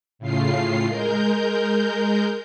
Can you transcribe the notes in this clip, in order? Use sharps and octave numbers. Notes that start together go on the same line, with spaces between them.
A2 C#3 F4 C7
G#3 A#4 G6